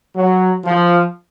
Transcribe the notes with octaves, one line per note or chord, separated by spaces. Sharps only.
F#3
F3